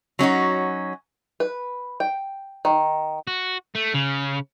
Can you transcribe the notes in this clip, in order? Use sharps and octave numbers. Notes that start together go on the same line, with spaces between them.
F#3 C#4 D#4 F#4
B4
G5
D#3
F#4
A3
C#3